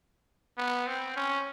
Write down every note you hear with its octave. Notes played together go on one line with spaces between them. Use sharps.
B3
C4
C#4